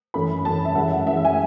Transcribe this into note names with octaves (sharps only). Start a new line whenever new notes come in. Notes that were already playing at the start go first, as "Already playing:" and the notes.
F#2 E3 A3 B5
F#2 E3 A3 A5
E5
F#2 E3 G#3 F#5
E5
F#2 E3 G#3 E5
G#5